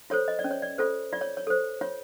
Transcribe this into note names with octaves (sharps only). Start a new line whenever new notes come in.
F4 A4 C5 C#5
D#5
D5
C#4
C#5
D5
F4 A4 C5
F4 D5
C#5
C#5
A4 C5
F4 C#5